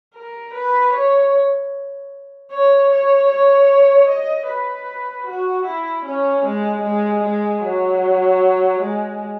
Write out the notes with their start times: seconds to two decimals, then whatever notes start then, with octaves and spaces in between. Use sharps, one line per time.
0.15 A#4
0.54 B4
0.93 C#5
2.51 C#5
2.90 C#5
3.30 C#5
4.09 D#5
4.48 B4
5.27 F#4
5.66 E4
6.05 C#4
6.45 G#3
6.84 G#3
7.24 G#3
7.63 F#3
8.81 G#3